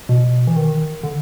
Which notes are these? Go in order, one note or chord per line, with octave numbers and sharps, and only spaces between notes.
B2
E3
D#3
D3